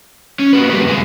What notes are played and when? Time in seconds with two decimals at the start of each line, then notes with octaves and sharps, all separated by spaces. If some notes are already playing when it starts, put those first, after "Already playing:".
0.39 C#4
0.53 A#3 F#4 B4
0.70 D3 G3 G4 B4
0.85 F#2 C3 G#3 G#5